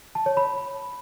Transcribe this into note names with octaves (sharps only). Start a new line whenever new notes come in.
A5
C#5
B5